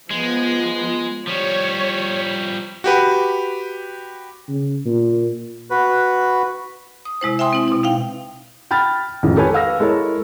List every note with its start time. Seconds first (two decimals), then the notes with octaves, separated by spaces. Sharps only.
0.10 F3 G#3 B3
1.27 F3 G3 C#5
2.84 F#4 G4 B4
4.49 C#3
4.85 A#2
5.71 F#4 B4
7.05 D#6
7.21 C3 G#3 E4 C5
7.39 E5 G5 G#5 C6 D#6
7.53 C4 E4
7.68 B2 E4
7.83 D#4 F5 G5
8.71 G5 B5 F6 A6
9.23 A1 F2 D#3 G#3
9.36 G4 A4 B4 C#5 G#5
9.53 B4 F5 E6 A#6
9.80 G#3 E4 A4 A#4 C#5